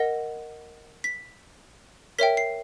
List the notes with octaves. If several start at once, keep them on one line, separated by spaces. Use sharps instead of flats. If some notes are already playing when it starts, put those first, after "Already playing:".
Already playing: A#4 D#5 F#5 A#6
B6
A#4 C#5 E5 G5 B6
C7